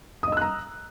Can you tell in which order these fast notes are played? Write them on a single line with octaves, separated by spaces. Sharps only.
D#6 D#5 E6 F#6 A#5